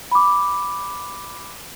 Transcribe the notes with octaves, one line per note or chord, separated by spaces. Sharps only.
B5 D6